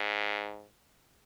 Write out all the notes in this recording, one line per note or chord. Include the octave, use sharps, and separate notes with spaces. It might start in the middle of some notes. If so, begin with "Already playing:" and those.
Already playing: G#2